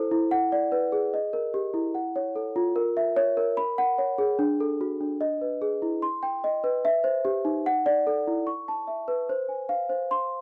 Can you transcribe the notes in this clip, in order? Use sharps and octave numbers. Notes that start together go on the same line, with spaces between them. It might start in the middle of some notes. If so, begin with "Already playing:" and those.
Already playing: E4 A4 C5
E4
F#5
D5
B4
G#4
D#5
A#4
G4
E4
F#5
C#5
A4
F4
A#4
E5
C#5
A#4
B5
F#5
C#5
G#4
D4
A4
F#4
D4
D#5
B4
G#4
E4
C6
G5
D#5
B4
E5
C5
G4
D#4
F#5
D5
A4
E4
C#6
A5
E5
B4
C5
G#5
F5
C5
C6